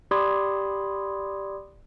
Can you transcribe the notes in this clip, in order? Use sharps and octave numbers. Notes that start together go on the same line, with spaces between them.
G4 D5 B5 C6 D#6 G#6